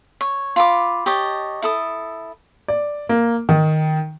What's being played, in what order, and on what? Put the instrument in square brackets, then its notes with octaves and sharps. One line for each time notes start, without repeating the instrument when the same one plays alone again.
[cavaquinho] C#5
F4 B5 D6
G4 C#5 D#5 A5
E4 A4 D#6
[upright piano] D5
A#3
D#3